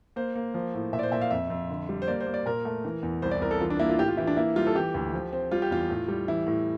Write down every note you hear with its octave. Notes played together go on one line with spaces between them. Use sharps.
A#3 C5
A#3
F3
A2
A#2 E5
D5
C5
A#2 E5
F5
F2 E5
F2
D3
G3
C5
A#3 D5
C5
A#3
D5
A#2 A#4
A3
E3
E2
C2 C5
D5
C2 A#4
A4
E3 F4
D4
A#3 E4
F4
A2 G4
F4
E3 E4
D4
A#3 E4
G3 F4
A4
E3 G4
D2
F3
C4
G3 F4
G4
E2 F4
A2
G3
E3 E4
A2